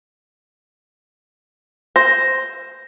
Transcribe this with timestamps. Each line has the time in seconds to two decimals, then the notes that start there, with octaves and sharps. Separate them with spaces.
1.96 C5 A#6